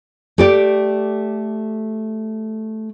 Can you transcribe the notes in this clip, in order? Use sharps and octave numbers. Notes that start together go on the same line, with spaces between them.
A3 G4 D5